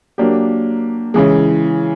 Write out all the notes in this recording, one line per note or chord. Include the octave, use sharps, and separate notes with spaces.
F#3 A#3 D4 G4
C#3 E3 G#3